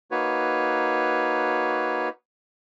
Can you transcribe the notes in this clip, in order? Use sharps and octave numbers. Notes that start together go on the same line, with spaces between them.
A#3 D#4 F#4 B4 C#5